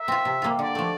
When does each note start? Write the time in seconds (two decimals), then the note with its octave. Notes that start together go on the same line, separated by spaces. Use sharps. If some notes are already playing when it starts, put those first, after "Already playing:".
Already playing: A#4 E5
0.08 C4 F4
0.25 C3
0.42 G3 A#3 F4
0.59 D3 D5
0.75 F3 A3